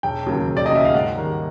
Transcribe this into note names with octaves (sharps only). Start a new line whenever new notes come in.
E1 G5
D#2 C#3 F#3 A#3
E1
D5
D#5
D#2 C#3 F#3 A#3 E5
F5
G#2 F#5
D#3 G3 A#3